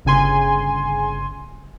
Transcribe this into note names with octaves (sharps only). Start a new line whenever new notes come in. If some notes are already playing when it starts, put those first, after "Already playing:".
G1 C#3 G#5 C6